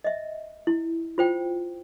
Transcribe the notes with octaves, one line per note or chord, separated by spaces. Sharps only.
D#5 E5
E4
F4 C5 G5